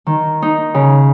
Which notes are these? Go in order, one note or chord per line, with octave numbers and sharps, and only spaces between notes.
D#3
D#4
C#3